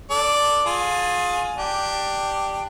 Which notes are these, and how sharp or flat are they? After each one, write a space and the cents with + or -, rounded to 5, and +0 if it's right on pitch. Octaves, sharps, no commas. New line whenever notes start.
A4 +5 D5 +0
F4 +30 G#4 +15
D4 +10 G4 +0